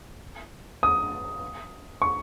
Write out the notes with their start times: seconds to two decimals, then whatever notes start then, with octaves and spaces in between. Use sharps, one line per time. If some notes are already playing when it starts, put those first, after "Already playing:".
0.83 D#6
2.02 C#6